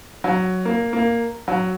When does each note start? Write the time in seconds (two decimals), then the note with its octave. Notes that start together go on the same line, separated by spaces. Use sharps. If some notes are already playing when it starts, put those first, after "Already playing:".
0.24 F#3
0.65 A#3
0.93 A#3
1.48 F#3